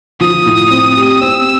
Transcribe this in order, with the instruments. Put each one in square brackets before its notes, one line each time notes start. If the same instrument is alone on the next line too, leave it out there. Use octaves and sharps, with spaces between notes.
[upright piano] F3 [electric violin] D#6
[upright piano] A2
C4
G4
[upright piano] C4 [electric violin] E6